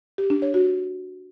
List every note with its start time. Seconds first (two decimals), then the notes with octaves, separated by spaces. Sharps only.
0.18 G4
0.30 D4
0.42 C#5
0.54 F#4